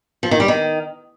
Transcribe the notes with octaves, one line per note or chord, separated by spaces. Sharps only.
F3
D#3
G3
D#3